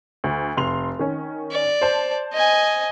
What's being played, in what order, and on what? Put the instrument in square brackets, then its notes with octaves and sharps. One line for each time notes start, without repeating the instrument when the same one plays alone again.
[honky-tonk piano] D2
F1 C6 F7
D#3 C#4
[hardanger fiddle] D5
[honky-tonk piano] C5 A5
[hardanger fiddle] D#5 G#5